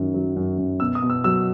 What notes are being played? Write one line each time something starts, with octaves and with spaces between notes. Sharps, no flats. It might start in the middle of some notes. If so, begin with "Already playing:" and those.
Already playing: F#2 D#3 F#3
F#3
F#2
F#2
B2 E6
D#6
B2
E6
F#3 E6